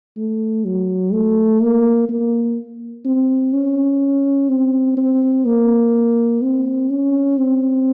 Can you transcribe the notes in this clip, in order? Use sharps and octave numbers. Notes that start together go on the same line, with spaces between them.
A3
F#3
A3
A#3
A#3
C4
C#4
C4
C4
A#3
C4
C#4
C4